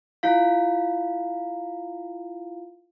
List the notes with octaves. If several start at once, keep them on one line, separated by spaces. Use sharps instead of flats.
E4 F4 F5